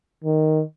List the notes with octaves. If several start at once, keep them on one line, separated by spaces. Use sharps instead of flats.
D#3